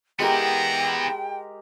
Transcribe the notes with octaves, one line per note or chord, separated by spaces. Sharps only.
G#3 B3 E4 G4 A#4 G5 A#5